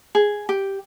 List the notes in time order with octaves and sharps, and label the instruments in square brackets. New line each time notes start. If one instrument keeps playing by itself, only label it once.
[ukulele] G#4
G4